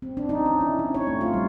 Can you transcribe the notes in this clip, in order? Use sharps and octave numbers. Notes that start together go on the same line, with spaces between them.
C4
D4
D#4
C#4
E4
C4
C#5
A3
F4
G3